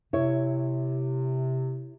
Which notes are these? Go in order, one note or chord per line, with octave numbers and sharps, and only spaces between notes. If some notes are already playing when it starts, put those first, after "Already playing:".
C3 E4 C#5